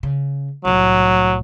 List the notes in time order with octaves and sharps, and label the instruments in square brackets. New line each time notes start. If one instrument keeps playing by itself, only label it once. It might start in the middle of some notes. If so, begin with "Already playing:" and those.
[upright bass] C#3
[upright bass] C2 A2 [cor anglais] F#3